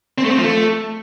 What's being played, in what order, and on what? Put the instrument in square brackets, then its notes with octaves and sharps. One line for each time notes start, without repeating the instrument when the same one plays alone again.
[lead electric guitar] C4
A3
C4
F3
A3